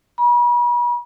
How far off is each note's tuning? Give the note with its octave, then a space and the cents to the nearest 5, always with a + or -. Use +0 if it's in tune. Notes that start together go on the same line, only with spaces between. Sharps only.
B5 -40